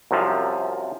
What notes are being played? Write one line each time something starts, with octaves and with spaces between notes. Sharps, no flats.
C2 F#2 C3 F3